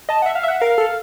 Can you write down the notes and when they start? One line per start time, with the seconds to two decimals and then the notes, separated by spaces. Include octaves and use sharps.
0.09 D#5 A5
0.22 E5 F#5
0.35 F5
0.43 E5
0.48 F#5
0.60 A#4 F5
0.78 A4